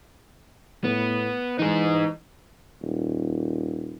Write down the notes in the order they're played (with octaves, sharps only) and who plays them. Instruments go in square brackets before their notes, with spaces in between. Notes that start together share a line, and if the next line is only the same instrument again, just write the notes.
[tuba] A2 [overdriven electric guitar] B3
[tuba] E3 [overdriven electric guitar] D#4 G#4
[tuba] D#1